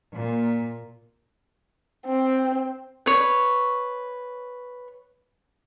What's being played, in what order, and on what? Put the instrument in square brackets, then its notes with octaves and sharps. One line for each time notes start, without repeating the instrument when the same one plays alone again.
[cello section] A#2
[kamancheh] C4
[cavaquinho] B4 C#5